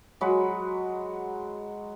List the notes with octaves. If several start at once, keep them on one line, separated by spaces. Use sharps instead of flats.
F#3 G#3 F#4 B5